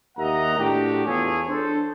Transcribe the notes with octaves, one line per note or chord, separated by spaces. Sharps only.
D#2 A#3 D#5 E5 F#5 A#5
A2 D4 F#4 G4
E2 F4 G#4 A4 C#5 G#5
D4 A4 C5